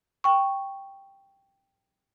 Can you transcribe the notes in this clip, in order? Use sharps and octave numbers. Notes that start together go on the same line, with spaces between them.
G5 C#6